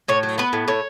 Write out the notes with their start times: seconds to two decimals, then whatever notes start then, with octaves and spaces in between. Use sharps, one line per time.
0.08 A2 C#5
0.23 F#3
0.38 B3 B4
0.53 A2
0.68 A2 C#5